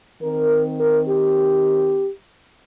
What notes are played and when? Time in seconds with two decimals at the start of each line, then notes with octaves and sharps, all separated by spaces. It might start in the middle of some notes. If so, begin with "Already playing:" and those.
0.21 D#3 C4 A#4
0.79 A#4
1.08 G4